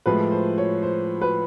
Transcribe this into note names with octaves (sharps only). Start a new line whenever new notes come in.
A2 F3 G#3 B4
C5
C#5
C5
B4